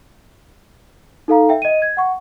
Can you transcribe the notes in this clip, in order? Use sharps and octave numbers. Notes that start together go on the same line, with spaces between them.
D#4 A4 F5 A#5
E5 G5
D#5 D#7
G#6
F#5 C#6